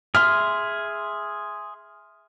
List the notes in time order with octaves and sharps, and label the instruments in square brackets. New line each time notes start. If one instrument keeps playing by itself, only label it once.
[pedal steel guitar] G#4 E5 C6 [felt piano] F6